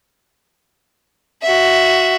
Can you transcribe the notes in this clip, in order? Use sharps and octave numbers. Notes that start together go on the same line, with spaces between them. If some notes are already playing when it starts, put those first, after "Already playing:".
F#4 E5